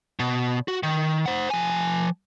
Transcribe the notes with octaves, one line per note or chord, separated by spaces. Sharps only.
B2
F#4
D#3
C5 F#5
F3 G#5